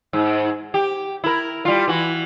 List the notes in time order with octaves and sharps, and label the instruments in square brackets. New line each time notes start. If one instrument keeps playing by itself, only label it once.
[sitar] G#2
G4
E4 A#4
G3 F4
E3 F#4